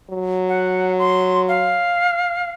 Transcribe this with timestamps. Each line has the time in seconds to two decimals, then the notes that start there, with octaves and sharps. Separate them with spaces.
0.10 F#3
0.48 F#5
0.99 C6
1.48 F5